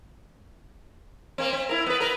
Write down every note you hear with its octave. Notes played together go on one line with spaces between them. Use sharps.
A#3 C4
C4
E4 A#4
B3 B4
A#4 B4